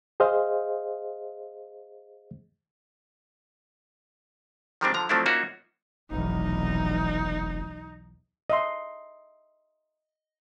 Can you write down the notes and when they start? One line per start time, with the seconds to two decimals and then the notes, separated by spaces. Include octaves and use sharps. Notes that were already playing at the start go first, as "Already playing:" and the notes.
0.20 G#4 C5 D#5 F5
4.81 D#3 F3 G3 G#3 C4 D4
4.94 D3 F3 A#5
5.09 F3 F#3 A3 C4 D4 E4
5.26 A#3 C#4 D#4 F4 F#4 E5
6.11 F1 B1 E2 D#4
8.50 D#5 E5 C6